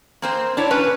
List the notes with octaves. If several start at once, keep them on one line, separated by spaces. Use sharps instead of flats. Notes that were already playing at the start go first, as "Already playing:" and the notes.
A#3 C4 C5
D4 E4 C#5
C#4 B4